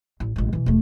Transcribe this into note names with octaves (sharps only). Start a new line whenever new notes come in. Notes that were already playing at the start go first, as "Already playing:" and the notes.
A1
A1 G#3
B2 E3
E1 A3